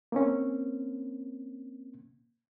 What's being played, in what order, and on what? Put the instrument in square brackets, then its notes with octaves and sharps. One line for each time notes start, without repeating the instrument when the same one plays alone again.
[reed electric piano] A#3 C4 C#4